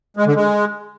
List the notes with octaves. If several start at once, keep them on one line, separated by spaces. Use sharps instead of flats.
G#3
D3
G#3